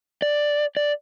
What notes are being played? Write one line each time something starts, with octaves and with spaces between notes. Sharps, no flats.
D5
D5